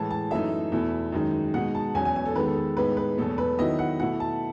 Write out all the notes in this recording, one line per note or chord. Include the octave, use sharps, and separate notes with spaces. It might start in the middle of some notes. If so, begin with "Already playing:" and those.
Already playing: A2 E3 G#3 A5
A5
F#2 E3 A3 D#4 E5
E2 B2 A3 E4
F#2 D#3 G#3 D#4
B2 G#3 D#4 F#5
A5
E2 B2 F#3 C#4 G#5
G#5
G#5
A4
D#3 G#3 B3 B4
A4
A4
A2 G#3 B3 D#4 B4
B4
E2 B2 F#3 A3 A4
B4
D#3 F#3 B3 E4 D#5
F#5
B2 A3 E4 F#5
A5